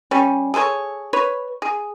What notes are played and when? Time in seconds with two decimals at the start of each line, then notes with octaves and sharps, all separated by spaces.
0.11 G3 C#4
0.54 G#4 A4 B4 C#5
1.13 B4 C#5
1.62 G#4